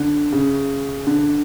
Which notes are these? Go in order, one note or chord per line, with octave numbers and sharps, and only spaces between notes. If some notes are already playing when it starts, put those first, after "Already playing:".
Already playing: D3
C#3
D3